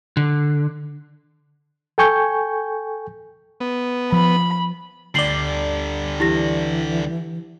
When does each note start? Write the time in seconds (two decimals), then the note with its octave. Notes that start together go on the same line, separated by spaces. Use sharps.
0.17 D3
1.98 A4 G5 G#5 C#6 G6
3.60 B3
4.12 F3 B5
5.15 D2 D3 G3 D5 C7 F#7 G7
6.20 E3 E4 G4 A#6